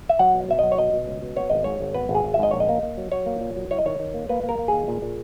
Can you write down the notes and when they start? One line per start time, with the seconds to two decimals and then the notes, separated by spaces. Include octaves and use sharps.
0.09 E5
0.19 F#3 F#5
0.34 B2
0.48 B2 E5
0.59 F#3 D#5
0.72 C#5
0.78 B2 D#5
0.93 B2
1.07 C#2
1.22 B2
1.36 B3 C#5
1.50 G#1 D#5
1.64 G#2 C#5
1.80 G#1
1.94 B3 B4
2.09 G#1
2.15 G#4
2.24 G#1
2.34 E5
2.39 G#2 D#5
2.51 A#1 C#5
2.60 D#5
2.69 A#3
2.83 A#3
2.97 F#3
3.12 F#3 C#5
3.26 A#3
3.41 A#2
3.56 F#3
3.71 E4 C#5
3.78 D#5
3.86 D#3 C#5
3.99 D#3
4.14 A#3
4.29 A#3 B4
4.43 A#3
4.49 A#4
4.59 A#3
4.68 D#2 G#4
4.88 A#2
5.02 A#2